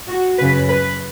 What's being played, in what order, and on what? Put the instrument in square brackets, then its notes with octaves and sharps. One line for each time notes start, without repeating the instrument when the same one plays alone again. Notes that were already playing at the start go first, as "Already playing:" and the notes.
[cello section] F#4
F#2 C#3 F#3 B4
B4